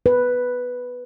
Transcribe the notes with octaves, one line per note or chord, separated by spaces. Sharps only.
B4